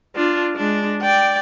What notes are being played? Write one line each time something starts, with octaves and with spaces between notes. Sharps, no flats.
D4 F4
G#3 D4
D5 G5